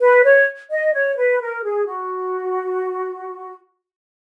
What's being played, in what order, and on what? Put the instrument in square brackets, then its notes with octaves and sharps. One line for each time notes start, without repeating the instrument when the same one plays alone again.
[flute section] B4
C#5
D#5
C#5
B4
A#4
G#4
F#4